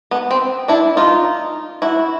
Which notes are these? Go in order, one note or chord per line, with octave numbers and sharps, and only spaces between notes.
B3
C4
D4 E4
D#4 F4
E4 F#4